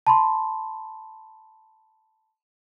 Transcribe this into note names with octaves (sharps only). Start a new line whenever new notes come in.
A5 B5 C6